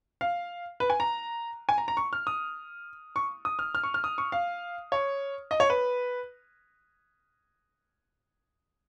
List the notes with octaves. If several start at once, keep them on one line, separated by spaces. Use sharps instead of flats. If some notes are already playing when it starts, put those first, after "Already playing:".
F5
B4
G#5
A#5
G#5
A#5
A#5
C#6
F6
D#6
C#6
D#6
F6
F6
C#6
F6
D#6
C#6
F5
C#5
D#5
C#5
B4